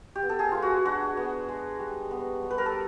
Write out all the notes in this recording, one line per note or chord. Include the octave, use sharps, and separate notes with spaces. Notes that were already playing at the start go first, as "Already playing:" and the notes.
G4
B3
A4
G#4
G#3 F4
F#4
D4 F#4
B3
G#3
G3
B3
G3
B4
A#4
A4